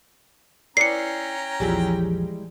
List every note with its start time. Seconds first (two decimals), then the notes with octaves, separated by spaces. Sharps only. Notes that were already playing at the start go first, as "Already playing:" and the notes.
0.77 C#4 E4 B4 D5 G5 A#5 C7 C#7
1.60 A#1 E2 F3 G3 G#3 E4